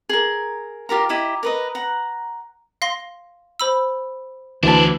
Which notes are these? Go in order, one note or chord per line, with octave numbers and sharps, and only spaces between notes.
G#4 A#4
F4 G4 A#4 A#5
E4 G4 D#5 A#5
A#4 B4 D#5
F#5 A#5
F5 C6 A#6
C5 B5 E6
D2 E3 D4 E4 C5 A5